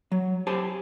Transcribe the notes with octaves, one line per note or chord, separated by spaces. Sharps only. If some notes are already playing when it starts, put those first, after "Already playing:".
F#3
G4 C5 G#5 A5